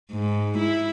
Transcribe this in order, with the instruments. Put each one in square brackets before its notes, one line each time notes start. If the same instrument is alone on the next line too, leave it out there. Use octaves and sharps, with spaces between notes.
[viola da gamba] G#2
E4